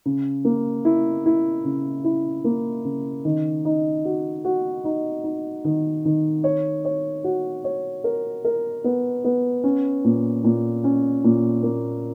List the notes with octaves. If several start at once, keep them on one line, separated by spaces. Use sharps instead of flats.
C#3
A#3
E4
E4
C#3
E4
A#3
C#3
D#3
D#4
F#4
F#4
D#4
D#4
D#3
D#3
C#5
C#5
F#4
C#5
A#4
A#4
B3
B3
C#4
A#2
A#2
C#4
A#2
A#3